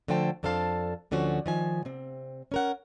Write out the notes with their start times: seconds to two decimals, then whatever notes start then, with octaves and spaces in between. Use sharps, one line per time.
0.08 D3 F3 A3 C5 G5 A5
0.43 F2 D4 A4 C5 F5 A5
1.11 D2 D3 F3 C#4 F#4
1.46 D#3 F3 G#5
1.85 C3 C4
2.52 C#4 A#4 F#5